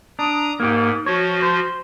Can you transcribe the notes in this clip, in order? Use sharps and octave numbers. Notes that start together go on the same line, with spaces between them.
D4 A#5 D#6
G#2 A#3 G4
F3 F#4 C#5
C5